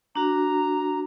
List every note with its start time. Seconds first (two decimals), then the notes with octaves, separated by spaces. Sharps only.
0.15 D4 F#4 A#5